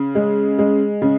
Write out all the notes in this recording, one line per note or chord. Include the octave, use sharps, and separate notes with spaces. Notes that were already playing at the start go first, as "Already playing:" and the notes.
Already playing: C#3
G#3
G#3
C#3